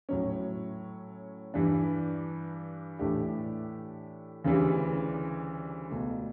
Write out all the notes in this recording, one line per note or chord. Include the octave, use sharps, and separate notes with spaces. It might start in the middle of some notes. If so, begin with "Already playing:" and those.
A2 F#3 C#4
G2 E3 G3 D4
A2 E3 A3 D4 G4
D2 C#3 E3 G3 D4
C#2 B2 A3